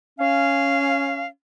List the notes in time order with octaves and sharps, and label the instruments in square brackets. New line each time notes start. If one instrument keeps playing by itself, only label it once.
[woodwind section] C#4 F5